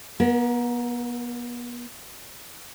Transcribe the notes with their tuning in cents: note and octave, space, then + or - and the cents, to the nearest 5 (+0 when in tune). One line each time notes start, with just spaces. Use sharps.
B3 -35 A#4 +15